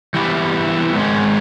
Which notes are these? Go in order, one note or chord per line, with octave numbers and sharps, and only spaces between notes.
E3 G3 B3 E4 G4
G#2 D#3 G#3 C#4